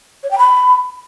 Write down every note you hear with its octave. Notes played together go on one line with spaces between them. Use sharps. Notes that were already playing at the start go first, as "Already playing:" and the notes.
C#5
G5
B5